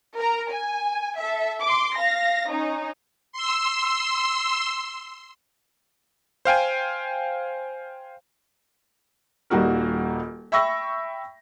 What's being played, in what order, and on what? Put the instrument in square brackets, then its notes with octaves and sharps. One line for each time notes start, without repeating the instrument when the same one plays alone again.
[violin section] A#4 A#5
G#5
A4 E5
C6 D6
F5 A#6
C#4 D#4
[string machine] C6 E6
[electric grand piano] C5 F5 G5 G#5
[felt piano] D#1 G3 A#3 D#4 F#4 A#4
E5 G5 B5 C#6 E6 A#6